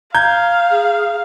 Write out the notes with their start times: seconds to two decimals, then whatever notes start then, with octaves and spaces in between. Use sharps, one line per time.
0.15 F5 A#5 G6 G#6
0.70 G#4